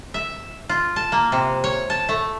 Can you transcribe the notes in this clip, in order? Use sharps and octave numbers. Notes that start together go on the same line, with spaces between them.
E5
F4
A5
A#3
C3
C#5
A5
A3